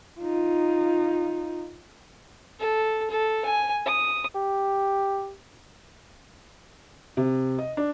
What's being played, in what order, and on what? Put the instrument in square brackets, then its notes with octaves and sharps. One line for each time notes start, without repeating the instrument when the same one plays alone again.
[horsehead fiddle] D#4 F4
[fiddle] A4
A4
G#5
D#6
[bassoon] G4
[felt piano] C3
D#5
D4